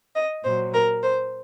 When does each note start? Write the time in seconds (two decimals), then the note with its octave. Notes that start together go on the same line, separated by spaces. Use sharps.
0.15 D#5
0.44 A#2 F#3 C5
0.74 A#4
1.02 C5